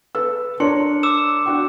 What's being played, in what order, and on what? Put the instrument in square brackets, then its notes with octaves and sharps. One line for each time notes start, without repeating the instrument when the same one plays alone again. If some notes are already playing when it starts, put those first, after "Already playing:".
[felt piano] A4 B4 E6
[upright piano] D4 [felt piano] A#4 C#5 [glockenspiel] C6 C#7
[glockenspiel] D6 E6 E7
[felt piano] D4 F#4 G5